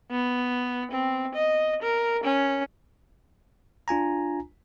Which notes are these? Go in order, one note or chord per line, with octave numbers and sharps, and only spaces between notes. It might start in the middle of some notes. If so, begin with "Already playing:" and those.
B3
C4
D#5
A#4
C#4
D4 F4 G#5 A#5